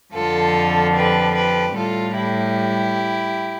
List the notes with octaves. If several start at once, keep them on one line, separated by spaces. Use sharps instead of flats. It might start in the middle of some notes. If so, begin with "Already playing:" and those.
F2 D3 F3 F4 A4
G4 B4
G4 B4
A2 G3 F4 A4
E4 G4